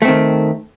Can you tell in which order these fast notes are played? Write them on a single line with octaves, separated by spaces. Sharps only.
A3 C4 D#3